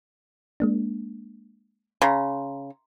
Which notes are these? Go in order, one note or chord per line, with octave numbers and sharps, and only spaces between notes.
G#3 A#3 D4
C#3 A#5 C6